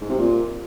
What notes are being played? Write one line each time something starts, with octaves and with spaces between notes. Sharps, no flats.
G#2
C3
A#2